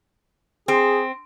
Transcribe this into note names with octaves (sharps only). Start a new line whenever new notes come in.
C4 G#4